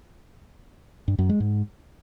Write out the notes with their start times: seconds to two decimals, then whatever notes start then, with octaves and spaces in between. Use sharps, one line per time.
1.08 G2
1.19 F#2
1.29 G#3
1.40 G#2